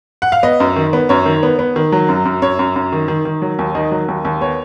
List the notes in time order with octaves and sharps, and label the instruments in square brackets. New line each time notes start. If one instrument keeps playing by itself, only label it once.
[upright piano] F#5
F5
B3 D#5
F#2
D#3
B3
F#2 C#5
D#3
B3
B3
D#3
F#3
F#2
F#2
F#2 C#5
F#2
F#2
D#3
D#3
D#3
F#3
D#2
D#3 D#5
F#3
D#2
D#2
B3 C#5